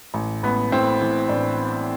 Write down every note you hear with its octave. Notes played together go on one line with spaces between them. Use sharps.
A1
A1 B3
A2 C4
E3
A1 D4